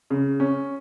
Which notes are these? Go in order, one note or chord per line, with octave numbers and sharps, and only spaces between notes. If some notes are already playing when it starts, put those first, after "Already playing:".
C#3
C#4